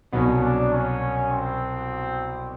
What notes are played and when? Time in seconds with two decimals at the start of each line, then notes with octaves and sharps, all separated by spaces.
0.13 C2 B2 F#3 B3 C#4
0.42 D4
0.71 C#4
1.31 C4